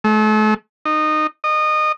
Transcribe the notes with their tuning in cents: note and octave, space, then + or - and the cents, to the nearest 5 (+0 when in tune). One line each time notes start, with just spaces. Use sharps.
A3 -40
D#4 -20
D#5 -25